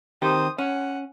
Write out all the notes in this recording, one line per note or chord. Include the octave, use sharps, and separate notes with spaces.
D#3 C4 G4 C5 D#6
C#4 F#5